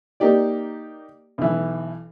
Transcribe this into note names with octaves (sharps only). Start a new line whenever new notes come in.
A#3 D#4 G4 D5
B1 E3